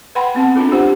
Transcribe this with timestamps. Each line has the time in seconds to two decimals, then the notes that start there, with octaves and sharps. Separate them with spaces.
0.15 B4 F#5 G5 B5 C6
0.35 B3 C4 F#5 A5
0.56 C#4 D4 F4 A4
0.71 D4 G4 C5 F#5